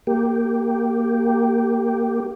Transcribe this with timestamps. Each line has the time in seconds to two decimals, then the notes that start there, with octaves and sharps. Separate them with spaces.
0.07 A#3 G4